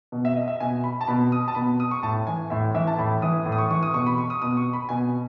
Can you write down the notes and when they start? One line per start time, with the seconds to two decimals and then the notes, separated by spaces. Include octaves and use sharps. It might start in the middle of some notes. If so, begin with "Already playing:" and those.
0.12 B2
0.25 E5
0.36 D#5
0.48 E5
0.60 B2 G#5
0.84 B5
1.01 A5
1.07 B2 B5
1.32 D#6
1.48 A5
1.55 B2 B5
1.80 D#6
1.91 C#6
2.03 A2 A5
2.27 E3 G#5
2.50 A2 E5
2.75 E3 E5
2.87 A5
2.98 A2 B5
3.22 E3 D#6
3.46 A2
3.52 D#6
3.58 C#6
3.70 E3 C#6
3.83 D#6
3.94 B2 C#6
4.06 B5
4.18 C#6
4.30 D#6
4.42 B2 D#6
4.57 C#6
4.73 B5
4.89 B2 G#5